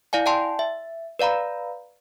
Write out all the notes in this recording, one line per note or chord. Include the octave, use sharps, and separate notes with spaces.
E4 D5 F5 G#5
D5 G5 A5 C6
E5
B4 D5 F5 A#5 B5